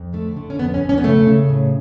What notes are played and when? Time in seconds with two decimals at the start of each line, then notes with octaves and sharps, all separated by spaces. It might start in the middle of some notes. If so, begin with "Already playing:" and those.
Already playing: F2
0.13 D3 A3
0.37 D3
0.50 C#4
0.59 F2 B3
0.74 C#4
0.82 F2
0.89 C#4
0.98 B3
1.04 C#3 A3
1.27 C#3
1.49 A2